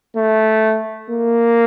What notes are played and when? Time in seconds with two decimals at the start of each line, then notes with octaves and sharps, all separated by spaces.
0.16 A3
1.09 A#3